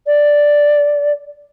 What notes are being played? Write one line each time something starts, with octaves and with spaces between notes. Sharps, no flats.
D5